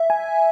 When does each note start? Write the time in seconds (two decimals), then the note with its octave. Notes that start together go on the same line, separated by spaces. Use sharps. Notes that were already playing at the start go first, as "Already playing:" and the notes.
Already playing: E5
0.10 G#5